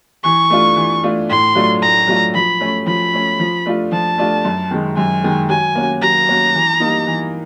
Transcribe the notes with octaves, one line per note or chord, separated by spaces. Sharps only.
E3 C#6
A3 D4 F4
E3
A3 D4 F4
A2 C6
F#3 A3 D4 F4
A2 A#5
F#3 A3 D4 F4
F3 B5
A3 C#4
F3 B5
A3 C#4
F3
A3 D4 F4
F3 A5
A3 D4 F4
F#2
D#3 G#3
F#2 G#5
D#3 G#3
F#3 G#5
A#3 C#4 F#4
F#3 A#5
A#3 C#4 F#4
E3
G3 A#3 D#4
E3